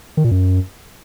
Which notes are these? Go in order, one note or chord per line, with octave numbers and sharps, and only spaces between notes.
D#3
A#2
F#2